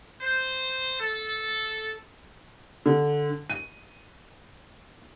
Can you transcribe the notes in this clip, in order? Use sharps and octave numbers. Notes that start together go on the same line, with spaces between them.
C5
A4
D3
D#7